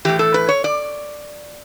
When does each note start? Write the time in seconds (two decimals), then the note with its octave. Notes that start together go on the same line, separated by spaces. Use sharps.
0.05 A2 E3 G4
0.19 A4
0.34 B4
0.49 C#5
0.64 D5